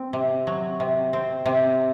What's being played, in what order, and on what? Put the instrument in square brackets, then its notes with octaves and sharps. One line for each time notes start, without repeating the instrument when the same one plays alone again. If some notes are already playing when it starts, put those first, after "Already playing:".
Already playing: [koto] C4
C3
F#3
C3
C4
C3